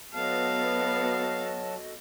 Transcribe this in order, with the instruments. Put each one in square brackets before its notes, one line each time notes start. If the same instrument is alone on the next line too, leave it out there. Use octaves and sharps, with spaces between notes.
[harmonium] F#3 A5 [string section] B3 [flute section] F#4 A4 D#5 [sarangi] F5